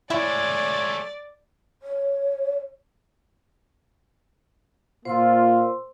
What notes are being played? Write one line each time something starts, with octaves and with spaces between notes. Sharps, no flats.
G#3 A3 E4 C#5 D5
C#5
A#2 A#3 F4 C5 C6 E6